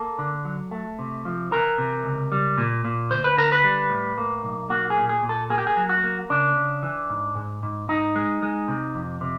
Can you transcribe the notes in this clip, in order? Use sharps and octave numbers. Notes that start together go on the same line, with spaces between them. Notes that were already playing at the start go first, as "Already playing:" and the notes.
Already playing: A#3 A4
D3
F#3
A3
C3
F3
E3 A#4
C3
C#2
G3
A#2
A#2
D2 C5
B4
D3 A#4
B4
G3
A2
A#3
B1
A#3 F#4
G#4
A#2
G#4
A#2
A4
A#3 G#4
G4
G#4
F#3
F#4
A#3
C#3 D4
C#3
E3
G#2
G#2
G#2
G#2 D#4
G#3
G#3
C3
F2
C3